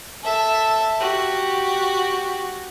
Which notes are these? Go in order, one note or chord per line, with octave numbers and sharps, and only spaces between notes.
A4 E5
F#4 G4